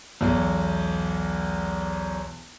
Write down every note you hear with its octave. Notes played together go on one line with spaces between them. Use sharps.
B1 E2